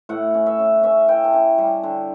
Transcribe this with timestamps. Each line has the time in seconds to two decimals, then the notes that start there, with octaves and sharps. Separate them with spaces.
0.09 A2 F#5
0.34 C#4
0.46 E5
0.59 C#4
0.83 C#4 E5
1.08 E4 G5
1.24 A5
1.33 C#4 G5
1.58 G3
1.83 D3